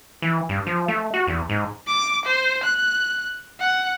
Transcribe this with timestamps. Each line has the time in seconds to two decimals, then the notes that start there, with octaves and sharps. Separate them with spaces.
0.22 E3
0.49 G2
0.67 F3
0.88 A3
1.14 F#4
1.27 E2
1.49 G#2
1.87 D6
2.25 C5
2.63 F#6
3.60 F#5